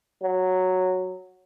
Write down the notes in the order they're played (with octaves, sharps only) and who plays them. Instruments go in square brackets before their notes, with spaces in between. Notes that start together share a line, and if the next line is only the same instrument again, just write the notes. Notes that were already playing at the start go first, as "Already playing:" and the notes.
[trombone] F#3